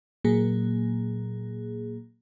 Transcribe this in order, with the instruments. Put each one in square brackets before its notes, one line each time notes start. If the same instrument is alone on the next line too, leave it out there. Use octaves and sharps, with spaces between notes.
[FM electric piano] A#2 F#3 A#3 G#4